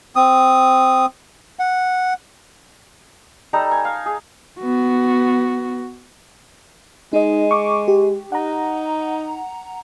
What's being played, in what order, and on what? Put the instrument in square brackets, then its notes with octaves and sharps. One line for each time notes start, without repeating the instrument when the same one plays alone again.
[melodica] C4 D#6
F#5
[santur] G3 D#4 A4 A#5
G#5
F5
G#4
[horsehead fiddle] B3 F#4
[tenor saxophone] G#3 [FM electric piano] D#4 D#5
[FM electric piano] C#6 D6
G4
[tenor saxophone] D#4 [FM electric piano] F#5 A#5